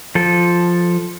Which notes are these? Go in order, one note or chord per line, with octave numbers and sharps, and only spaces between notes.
F3 A4